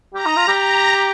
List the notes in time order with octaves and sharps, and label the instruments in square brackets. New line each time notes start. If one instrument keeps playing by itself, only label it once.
[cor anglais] G4 [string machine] A#5
[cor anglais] D#4
F4
G4
[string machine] A#5